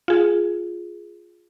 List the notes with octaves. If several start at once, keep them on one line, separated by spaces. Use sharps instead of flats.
F4 G#4